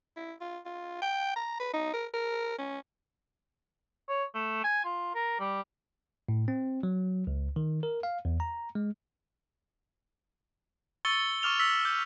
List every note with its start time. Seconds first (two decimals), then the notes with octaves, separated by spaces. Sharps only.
0.17 E4
0.41 F4
0.66 F4
1.02 G5
1.36 A#5
1.60 B4
1.74 D#4
1.94 A#4
2.14 A#4
2.59 C#4
4.08 C#5
4.34 A3
4.64 G#5
4.84 F4
5.14 A#4
5.39 G3
6.29 A2
6.48 C4
6.83 F#3
7.27 C#2
7.56 D#3
7.83 A#4
8.03 F5
8.25 E2
8.40 A#5
8.75 G#3
11.05 C#6 E6 A6 C#7 G7
11.42 C#6 D6 F6 F7 G7
11.59 E6 B6
11.85 D6 G6